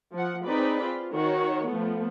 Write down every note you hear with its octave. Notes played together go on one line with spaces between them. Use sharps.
F3 F#5
C4 D#4 G#4 B4 D5 B5
F4
D#3 F#4 C#5
F3 A3 B3